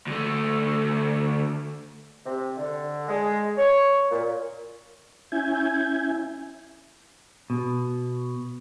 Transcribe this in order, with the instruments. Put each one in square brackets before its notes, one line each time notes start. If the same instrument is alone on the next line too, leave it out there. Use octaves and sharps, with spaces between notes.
[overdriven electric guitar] D2 A3
[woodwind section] C3
D3
G#3
C#5
A#2
[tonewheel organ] C#4 E4 E5 G#5 G6 G#6
[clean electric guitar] B2